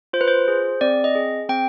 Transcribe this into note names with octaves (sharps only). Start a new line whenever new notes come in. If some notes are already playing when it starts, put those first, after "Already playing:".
F4 C5
B4
C5
G#4
C4 D5
D#5
G#4
C4 G5